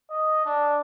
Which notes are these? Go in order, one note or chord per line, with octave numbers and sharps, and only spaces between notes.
D#5
D4